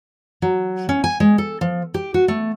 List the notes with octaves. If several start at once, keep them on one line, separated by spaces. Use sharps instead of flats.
F#3
C#4
G#5
G#3
A4
F3
G4
F#4
A3